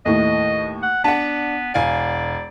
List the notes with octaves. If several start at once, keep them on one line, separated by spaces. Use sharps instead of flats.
D#2 A2 D#5
F#5
B3 D4 F#5 A5
E1 D5 F5 G#5